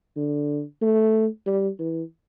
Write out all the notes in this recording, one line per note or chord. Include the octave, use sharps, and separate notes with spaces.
D3
A3
G3
E3